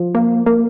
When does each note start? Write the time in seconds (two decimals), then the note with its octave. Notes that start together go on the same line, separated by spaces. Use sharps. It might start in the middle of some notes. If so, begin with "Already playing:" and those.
Already playing: F3
0.15 A#3
0.46 A#3